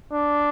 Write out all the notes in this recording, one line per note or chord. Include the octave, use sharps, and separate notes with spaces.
D4